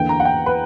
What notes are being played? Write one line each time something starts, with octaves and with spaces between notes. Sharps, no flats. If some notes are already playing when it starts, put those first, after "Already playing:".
Already playing: E2 D3 A#3 G5
A#5
F#5
G5
B4